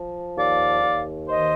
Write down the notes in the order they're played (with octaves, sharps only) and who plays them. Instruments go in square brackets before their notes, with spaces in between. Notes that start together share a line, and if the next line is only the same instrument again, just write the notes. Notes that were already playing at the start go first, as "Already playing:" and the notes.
Already playing: [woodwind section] F3
D#2 D5 F5
D#2
D#3 C5 D#5